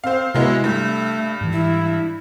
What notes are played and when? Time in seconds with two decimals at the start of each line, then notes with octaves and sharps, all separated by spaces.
0.04 C4 C5 F5
0.34 C3 F#3 G#3 B3 E4
0.64 G2 A3
1.41 G#2 E3
1.52 E4